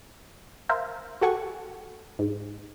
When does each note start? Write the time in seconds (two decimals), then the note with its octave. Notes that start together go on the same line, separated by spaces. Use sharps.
0.69 A#4 C5 E5 F5
1.21 F#4 G4 A4 F#5 G#5 C#6
2.19 G#2